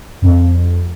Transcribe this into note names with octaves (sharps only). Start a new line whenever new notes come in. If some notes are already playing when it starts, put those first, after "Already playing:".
F2